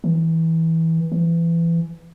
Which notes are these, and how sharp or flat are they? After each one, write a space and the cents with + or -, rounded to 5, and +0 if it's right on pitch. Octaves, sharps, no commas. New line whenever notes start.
E3 -20
E3 +25